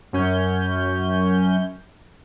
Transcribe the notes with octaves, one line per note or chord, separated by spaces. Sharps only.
F#2 C#4 G6